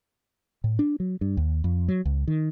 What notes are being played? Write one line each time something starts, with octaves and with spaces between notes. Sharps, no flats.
A2
D4
F#3
G2
D#2
F2
F#3
C#2
D#3